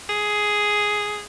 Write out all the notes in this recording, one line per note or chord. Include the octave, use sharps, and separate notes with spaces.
G#4